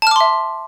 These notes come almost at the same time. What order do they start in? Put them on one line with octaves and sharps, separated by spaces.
A5 F6 D6 C6 E5